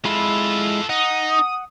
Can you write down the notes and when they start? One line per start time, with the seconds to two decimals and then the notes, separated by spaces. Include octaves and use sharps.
0.05 G#3 E4 F4 A4 B5
0.89 D#4 F#5 D#6